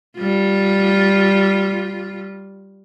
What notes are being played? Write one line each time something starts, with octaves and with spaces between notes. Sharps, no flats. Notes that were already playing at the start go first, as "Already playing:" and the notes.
G3 F4